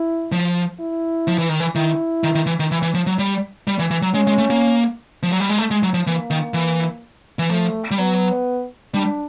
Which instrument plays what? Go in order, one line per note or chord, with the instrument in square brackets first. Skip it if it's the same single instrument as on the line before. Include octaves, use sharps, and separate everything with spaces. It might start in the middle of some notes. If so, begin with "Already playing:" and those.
Already playing: [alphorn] E4
[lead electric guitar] F3
[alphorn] E4
[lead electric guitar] F3
E3
D#3
E3
[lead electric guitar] D#3 [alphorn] E4
[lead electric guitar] D#3
D#3
E3
D#3
E3
E3
F3
F#3
G3
G3
E3
E3
F#3
[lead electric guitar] G#3 [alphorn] C#4
[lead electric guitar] G#3
A3
A#3
F3
F#3
G3
G#3
A3
G#3
F#3
F3
[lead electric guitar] E3 [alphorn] A#3
[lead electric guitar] D#3
E3
E3
[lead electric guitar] F3 [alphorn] A3
[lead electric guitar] G3
[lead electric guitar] F#3 [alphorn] B3
[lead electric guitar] G3 [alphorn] D4